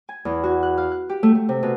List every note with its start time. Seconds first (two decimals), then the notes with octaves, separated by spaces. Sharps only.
0.09 G#5
0.25 E2
0.44 F#4
0.63 F#6
0.78 F5
0.92 F#6
1.09 G4
1.23 A3
1.35 A3
1.49 C3
1.63 B2